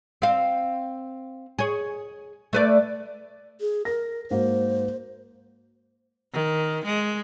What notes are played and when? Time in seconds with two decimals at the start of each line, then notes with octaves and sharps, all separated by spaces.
0.22 C4 F5
1.59 G#4 C#5
2.53 A3 B4 D5
3.61 G#4
3.85 A#4 A#6
4.31 G#2 A#3 F#4 C5
6.34 D#3
6.85 G#3